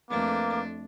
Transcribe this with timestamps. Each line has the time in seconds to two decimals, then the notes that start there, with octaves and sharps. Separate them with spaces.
0.11 F2 A3 A#3 D4 B4 D6